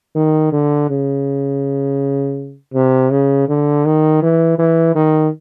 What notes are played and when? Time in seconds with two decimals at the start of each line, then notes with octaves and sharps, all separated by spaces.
0.16 D#3
0.52 D3
0.90 C#3
2.74 C3
3.11 C#3
3.49 D3
3.85 D#3
4.23 E3
4.59 E3
4.95 D#3